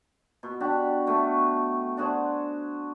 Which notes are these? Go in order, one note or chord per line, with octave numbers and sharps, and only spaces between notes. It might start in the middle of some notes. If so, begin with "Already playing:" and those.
B2
D4 F#4 G4
B2 A3
D4 F#4 G#4 C5